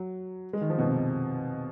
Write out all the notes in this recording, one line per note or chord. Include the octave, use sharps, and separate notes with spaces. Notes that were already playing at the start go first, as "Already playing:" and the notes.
Already playing: F#3
G#3
D#3
F3
B2
C3